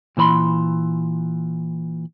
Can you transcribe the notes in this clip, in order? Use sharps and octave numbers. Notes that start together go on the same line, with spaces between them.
A#2 E3 C5 B5 C6